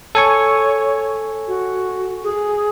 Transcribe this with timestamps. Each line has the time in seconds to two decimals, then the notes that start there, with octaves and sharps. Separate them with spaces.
0.15 A4 C#5 G#5 C#6
1.48 F#4
2.24 G#4